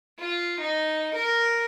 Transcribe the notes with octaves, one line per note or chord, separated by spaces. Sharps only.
F4
D#4
A#4